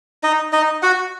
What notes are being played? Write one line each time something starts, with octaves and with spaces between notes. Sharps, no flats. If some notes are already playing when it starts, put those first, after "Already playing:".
D#4 D#5
D#4 D#5
F#4 F#5